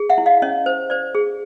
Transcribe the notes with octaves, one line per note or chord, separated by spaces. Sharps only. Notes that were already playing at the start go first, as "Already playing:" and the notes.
Already playing: G#4
E5 F#5
E4
D#5 F5
C#4 C#5 D#5
C5
C5 D5
G#4